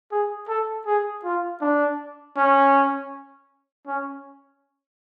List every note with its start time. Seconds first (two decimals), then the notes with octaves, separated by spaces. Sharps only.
0.12 G#4
0.48 A4
0.86 G#4
1.24 F4
1.61 D4
2.37 C#4
3.87 C#4